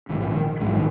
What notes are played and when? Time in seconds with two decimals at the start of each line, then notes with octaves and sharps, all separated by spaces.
0.09 A#1 G#2 D#3
0.20 F3
0.29 D#3
0.60 A#1 G#2 G#3
0.67 F3
0.75 D#3